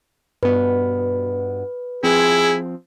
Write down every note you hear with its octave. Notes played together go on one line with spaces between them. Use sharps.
G2 B2 B3 B4
F3 C4 E4 G#4